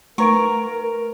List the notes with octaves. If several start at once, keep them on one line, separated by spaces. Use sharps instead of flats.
A3 A#4 B4 A#5 C#6 D7